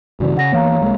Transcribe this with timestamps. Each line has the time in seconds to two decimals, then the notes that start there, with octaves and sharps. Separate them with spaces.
0.20 G2 C#3 E3 F#4 D5
0.37 C#3 F#5 A#6
0.52 E3 A#3 B3 C#5 F5 A#5
0.81 C2 G#3 A#3